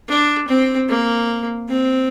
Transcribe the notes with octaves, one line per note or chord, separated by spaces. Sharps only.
D4
C4
A#3
C4